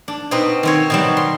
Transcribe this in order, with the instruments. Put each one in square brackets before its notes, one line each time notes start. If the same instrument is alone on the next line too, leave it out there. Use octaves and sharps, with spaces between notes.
[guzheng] D4
B2 C4 D#4 B4
D#3 C4 C#5
B2 F#3 G3
C6